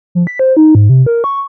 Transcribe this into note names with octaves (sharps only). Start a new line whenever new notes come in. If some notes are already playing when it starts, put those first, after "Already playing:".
F3
B6
C5
D#4
G#2
C3
A#4
C#6